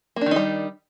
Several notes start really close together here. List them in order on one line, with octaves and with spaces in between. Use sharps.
A#3 D4 D#3 D#4 G3